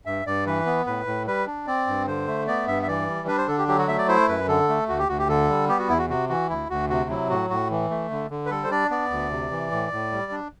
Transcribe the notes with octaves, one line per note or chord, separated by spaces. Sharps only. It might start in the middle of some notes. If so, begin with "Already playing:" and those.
G2 E5
G2 D5
E3 B4
B3
A2 B4
A2
G3 B4
D4
C4 D5
G2
D3 C5
A3
B3 D5
G2 E5
E5
E3 D5
G3
D4 B4
C5
D3 A4
G4
F#3 G4
F#4
A3 E5
D5
E4 C5
F#2 B4
D3 A4
A3
D2 F#4
G4
D2 F#4
G4
D3 A4
G3
B3 G4
F#4
E2 E4
F#4
C3 F#4
E3 F#4
D2 E4
D2 F#4
C3 F#4
F#3 E4
A2 F#4
A2 F#4
E3
A3
D3
D3
B4
G3 A4
C5
D4 D5
B3 D5
D2
C3
E3
A2
A2
G3
D4